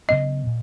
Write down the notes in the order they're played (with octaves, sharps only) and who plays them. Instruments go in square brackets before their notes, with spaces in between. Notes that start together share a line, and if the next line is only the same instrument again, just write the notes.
[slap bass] C#3 F#3 B3 D4 [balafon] D#5
[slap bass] A#2